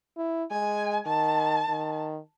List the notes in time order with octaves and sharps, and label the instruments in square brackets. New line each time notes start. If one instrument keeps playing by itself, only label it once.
[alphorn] E4
[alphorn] G#3 [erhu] G#5
[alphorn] D#3 [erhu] A5
[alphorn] D#3